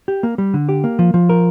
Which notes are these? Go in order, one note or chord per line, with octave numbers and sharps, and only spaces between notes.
G4
A#3
G3
D3
G4
A#3
F3
F3
A#4